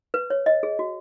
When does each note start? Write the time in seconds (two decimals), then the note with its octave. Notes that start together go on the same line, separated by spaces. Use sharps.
0.14 B4
0.30 C#5
0.46 D#5
0.63 G#4
0.79 F#4